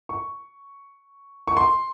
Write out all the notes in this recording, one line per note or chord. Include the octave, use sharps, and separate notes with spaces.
C#6
C#6
C6